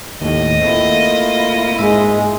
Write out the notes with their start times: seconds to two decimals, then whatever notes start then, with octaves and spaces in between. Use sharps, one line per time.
0.21 D#2 A2 D#5
0.62 A3 A#3 C4 E4 F4
1.79 G#2 G#3 E5